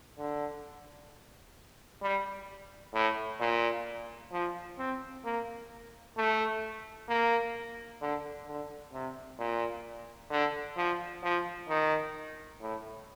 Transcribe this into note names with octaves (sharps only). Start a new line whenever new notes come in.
D3
G3
A2
A#2
F3
C4
A#3
A3
A#3
D3
D3
C3
A#2
D3
F3
F3
D#3
A2